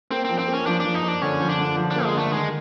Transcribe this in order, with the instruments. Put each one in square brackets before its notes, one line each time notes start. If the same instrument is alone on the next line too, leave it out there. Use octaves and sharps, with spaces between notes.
[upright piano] A#3 [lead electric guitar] C4
[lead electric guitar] C4
[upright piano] F3
[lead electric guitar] C4
[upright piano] A#3 [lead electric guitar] C#4
[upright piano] F3 [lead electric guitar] D4
[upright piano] F3 [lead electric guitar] D4
[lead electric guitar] D#4
[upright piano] F3
[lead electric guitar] D4
[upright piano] D3 [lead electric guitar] C#4
[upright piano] F3
[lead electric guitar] D4
[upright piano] D3
F3
[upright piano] A#3 [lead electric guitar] D4
[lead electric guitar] G#3
[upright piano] D3 [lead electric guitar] A3
[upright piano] D#3 [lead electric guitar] G#3